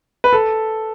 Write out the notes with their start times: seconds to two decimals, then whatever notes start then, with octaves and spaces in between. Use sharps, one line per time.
0.24 B4
0.33 A4